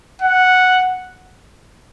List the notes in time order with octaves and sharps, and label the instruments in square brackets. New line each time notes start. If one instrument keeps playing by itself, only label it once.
[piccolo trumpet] F#5